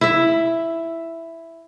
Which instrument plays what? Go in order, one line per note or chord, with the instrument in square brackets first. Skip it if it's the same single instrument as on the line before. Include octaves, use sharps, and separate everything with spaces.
[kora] E4 E5